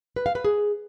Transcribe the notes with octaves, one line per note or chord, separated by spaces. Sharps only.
B4
F5
B4
G#4